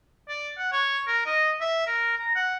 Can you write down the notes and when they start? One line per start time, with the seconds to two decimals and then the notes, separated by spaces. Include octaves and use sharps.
0.29 D5
0.58 F#5
0.72 C#5
1.07 A#4
1.26 D#5
1.61 E5
1.87 A#4
2.18 A#5
2.35 F#5